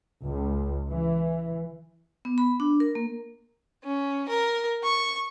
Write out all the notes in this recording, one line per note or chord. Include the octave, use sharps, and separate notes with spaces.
C#2
E3
B3
B5
D4
A#4
A#3
C#4
A#4
C#6